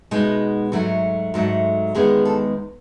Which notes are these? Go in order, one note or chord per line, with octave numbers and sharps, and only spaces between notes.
B2 G#3 B3 D#4
G#2 F#3 A3 F#4
G#2 F#3 A3
E2 D#3 G#3 B3 G#4
A4